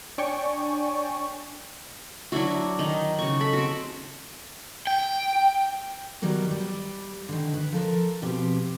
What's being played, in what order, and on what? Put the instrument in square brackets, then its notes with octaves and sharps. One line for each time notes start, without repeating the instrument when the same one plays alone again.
[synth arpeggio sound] D4 C#5 D5 G5 G#5 C#6
[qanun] F#3 D4 E4 F#4
D#3 D#4
C#3 F#4 C#6
A4 B5
C4 F#4
[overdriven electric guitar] G5
[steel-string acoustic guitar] D#3 F#3 G3 B3 A#4
G3
D3 D#3
B4
F3 A4 A#4
B2 F3 C4 G4